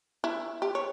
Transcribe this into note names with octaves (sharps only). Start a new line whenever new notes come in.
E4
G4
C#5